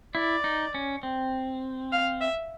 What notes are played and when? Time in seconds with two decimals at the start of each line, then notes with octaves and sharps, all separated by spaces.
0.15 E4 D5
0.44 D#4
0.74 C#4
1.03 C4
1.92 F5
2.21 E5